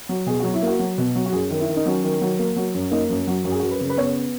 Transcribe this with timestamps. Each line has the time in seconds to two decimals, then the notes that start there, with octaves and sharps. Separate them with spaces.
0.09 F#3
0.26 B2 G#4
0.40 F#3 F#4
0.54 E4
0.62 A#3 F#4
0.79 F#3
0.98 B2
1.15 F#3
1.26 F#4
1.33 F#2 G#4
1.50 D#3
1.59 E4
1.68 D#3
1.76 D#4
1.86 F#3 C#4
2.04 D#3
2.21 F#3
2.39 A#3
2.56 F#3
2.75 F#2
2.91 A#3 D#4
3.10 F#2
3.27 F#3
3.44 F#2 F#4
3.51 G#4
3.60 F#4
3.62 F#2
3.71 B4
3.80 C#3
3.90 B4
3.97 B3 C#5